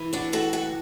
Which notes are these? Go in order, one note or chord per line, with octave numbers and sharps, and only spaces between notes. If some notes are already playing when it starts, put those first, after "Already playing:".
Already playing: E3
D4 F#4
A2 F#4 A4
F#4 A4